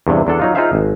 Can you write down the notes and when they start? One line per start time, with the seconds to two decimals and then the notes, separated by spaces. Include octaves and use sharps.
0.07 E2 G2 C3
0.27 E2 D4 A4 F#5
0.40 F#3 D#4 F4
0.55 D#4 F4 G#4 C5 E5 F5
0.73 G#1